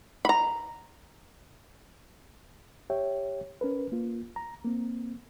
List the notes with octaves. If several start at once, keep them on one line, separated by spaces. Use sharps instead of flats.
A#5 B5
G4 C#5 E5 G5
C#4 A#4 B4
A#3 F4
A#5
A#3 C4